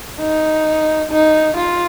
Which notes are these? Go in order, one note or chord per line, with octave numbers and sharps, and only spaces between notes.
D#4
D#4
F4